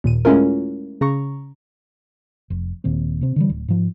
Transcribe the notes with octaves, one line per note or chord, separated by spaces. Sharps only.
D#2 A#2 D#7
G#3 A3 C#4 E4 F4 A#4
C#3 A#5 C#6
F1
D#1 D#2 A#2 C4
C3 C4
D3 E3 G3
D1
G#2 F3